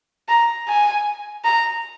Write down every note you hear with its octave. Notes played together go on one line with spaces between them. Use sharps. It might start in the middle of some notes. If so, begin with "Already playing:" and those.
A#5
G#5
A#5